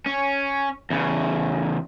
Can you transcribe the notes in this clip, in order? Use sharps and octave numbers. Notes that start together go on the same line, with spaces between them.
C#4
E2 C#3